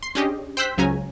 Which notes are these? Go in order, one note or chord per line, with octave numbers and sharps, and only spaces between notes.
C6 C7
C#4 D4 G4 G#4 D#5
C5 G5 E6 F#6 G6 B6
C#2 C#3 F#3 C#4 G#5 A#5